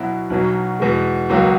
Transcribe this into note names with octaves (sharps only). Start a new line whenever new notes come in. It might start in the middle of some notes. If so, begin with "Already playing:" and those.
Already playing: B2 F#3 B3 E4
B1 B2 F#3
E2 B2 G#3
C#2 B2 F#3 A#3